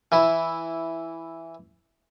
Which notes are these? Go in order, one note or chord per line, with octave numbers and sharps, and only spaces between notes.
E3 E4